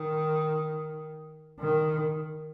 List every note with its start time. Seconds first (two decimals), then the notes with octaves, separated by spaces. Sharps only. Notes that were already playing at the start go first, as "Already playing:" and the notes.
Already playing: D#3
1.60 D#3